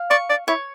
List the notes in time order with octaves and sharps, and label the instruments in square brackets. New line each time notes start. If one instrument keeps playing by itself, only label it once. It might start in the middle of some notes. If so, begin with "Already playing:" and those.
Already playing: [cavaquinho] F5
[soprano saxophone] D5 [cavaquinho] C#6
[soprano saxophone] D5
[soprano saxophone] E4 [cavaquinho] C#5